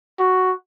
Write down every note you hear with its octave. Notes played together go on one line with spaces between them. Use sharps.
F#4